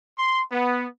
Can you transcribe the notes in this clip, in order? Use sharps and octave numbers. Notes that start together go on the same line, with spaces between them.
C6
B3